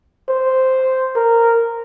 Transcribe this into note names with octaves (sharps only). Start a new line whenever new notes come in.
C5
A#4